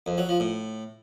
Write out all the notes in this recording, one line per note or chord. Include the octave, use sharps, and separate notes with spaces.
F2
F#3
F3
A2